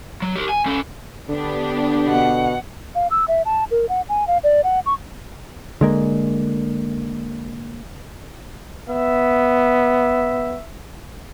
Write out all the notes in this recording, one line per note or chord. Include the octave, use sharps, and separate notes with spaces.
F#3
G4 A#4
G#5
C#4 A4
D3 B3 D4 G4
B2 F#5
F5
E6
E5
A5
A#4
F#5
G#5
F5
D5
F#5
C#6
D3 G#3 A#3
B3 E5